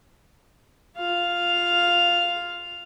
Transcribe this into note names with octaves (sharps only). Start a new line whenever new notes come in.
F4 F5